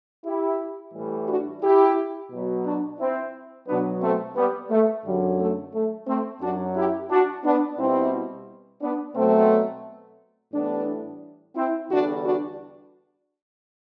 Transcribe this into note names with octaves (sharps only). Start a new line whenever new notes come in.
E4 G4
A2 E3 G3
D4 F#4
E4 G4
B2 F#3
D4 F#4
C4 E4
B2 F#3 B3 D4
A3 C4
G3 B3
A3
F#2 D3 F#3 G3
A3
A3
A3 C4
F#2 F#3 D4 F#4
E4 G4
D4 F#4
B3 D4
B2 G3 C4 E4
B3 D4
B2 F#3 A3 C4
A2 E3 G3 B3 D4
C4 E4
E2 D3 G3 D4 F#4
D4 F#4